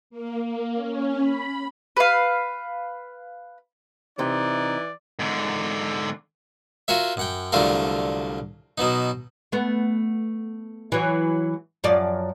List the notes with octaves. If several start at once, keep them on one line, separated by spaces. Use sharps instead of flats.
A#3
A#3
C#4
B5
B4 F5
C3 E3 D#4 D5
G#2 D3
F4 F#4 A#4 C#5 E5
F#2 F#5 G5
C2 D3 F#3 A3 F4 A#4
B2 F#3 B3 D#4
A3 B3
E3 F#3
F#2 F3 D5